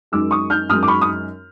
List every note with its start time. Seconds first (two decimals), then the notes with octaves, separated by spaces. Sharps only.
0.12 F#2 D#3 G#3 D6 E6
0.31 C#6 D#6
0.50 F6 G6
0.69 F#2 D#3 G#3 D#6 F6
0.83 D6
0.88 B5 C#6
1.02 D#6